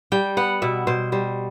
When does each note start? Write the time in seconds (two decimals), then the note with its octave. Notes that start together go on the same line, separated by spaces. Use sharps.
0.12 G3 G5
0.37 B3 F#5
0.62 B2 E5
0.87 B2 C5
1.12 G3 C5